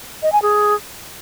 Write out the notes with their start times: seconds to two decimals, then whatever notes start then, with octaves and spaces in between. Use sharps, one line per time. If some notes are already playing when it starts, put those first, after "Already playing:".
0.23 D#5
0.32 G#5
0.42 G#4